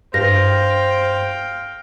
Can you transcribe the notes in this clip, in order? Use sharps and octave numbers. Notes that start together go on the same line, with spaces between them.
G2 C5 F5 G5 A#6